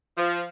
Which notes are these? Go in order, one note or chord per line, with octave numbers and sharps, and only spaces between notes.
F3